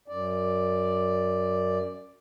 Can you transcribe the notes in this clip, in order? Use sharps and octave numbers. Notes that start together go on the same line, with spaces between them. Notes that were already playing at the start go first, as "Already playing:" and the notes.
F#2 D5